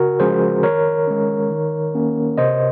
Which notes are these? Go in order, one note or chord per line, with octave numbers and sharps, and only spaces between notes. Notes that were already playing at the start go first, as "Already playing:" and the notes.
Already playing: C#3 F#4 A#4
F3 G#3 C#4 G#4 C5
D#3 A#4 C#5
G#3 C#4
D#3
A#3 C#4
C3 C5 D#5